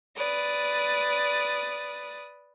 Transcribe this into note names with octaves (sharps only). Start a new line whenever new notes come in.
B4 D5 D#6